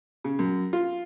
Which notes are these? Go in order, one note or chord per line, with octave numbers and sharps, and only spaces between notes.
C#3
F#2
F4